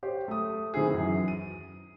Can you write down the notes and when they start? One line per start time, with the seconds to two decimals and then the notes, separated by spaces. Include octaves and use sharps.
0.03 G4 C5 C#5
0.28 A3 D#6
0.74 D#3 C4 E4 G#4
0.91 F#2 E3
1.28 D#7